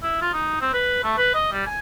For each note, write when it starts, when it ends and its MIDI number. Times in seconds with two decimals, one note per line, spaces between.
0.03 0.20 64
0.21 0.31 65
0.33 0.58 63
0.61 0.72 60
0.73 1.02 71
1.03 1.17 57
1.18 1.31 71
1.34 1.50 75
1.52 1.66 55
1.67 1.79 80